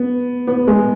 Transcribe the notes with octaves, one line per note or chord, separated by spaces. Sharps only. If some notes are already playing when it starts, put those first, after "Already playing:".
Already playing: B3
B3
G#3